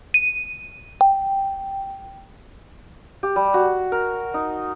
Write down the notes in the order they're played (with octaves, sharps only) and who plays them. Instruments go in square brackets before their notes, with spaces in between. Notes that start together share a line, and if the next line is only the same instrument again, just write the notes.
[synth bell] D#7
G5
[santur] G4
G3
F#4
A#4
D#4